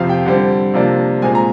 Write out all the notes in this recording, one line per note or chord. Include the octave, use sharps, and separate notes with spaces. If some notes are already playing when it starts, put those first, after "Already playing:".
Already playing: F2 C3 F3 C4 F5
G5
D3 G3 C4
C3 F3 A#3 D4
A#2 G#3 C4 G#5
A#5